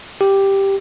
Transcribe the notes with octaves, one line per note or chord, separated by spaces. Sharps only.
G4